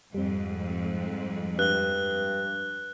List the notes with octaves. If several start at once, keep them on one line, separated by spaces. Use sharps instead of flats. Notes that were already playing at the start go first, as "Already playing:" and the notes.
F2 G#2 G3 C4
G2 F#6 G7